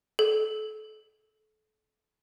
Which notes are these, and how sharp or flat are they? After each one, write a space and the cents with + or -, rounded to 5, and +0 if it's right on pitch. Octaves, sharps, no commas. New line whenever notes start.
A4 -30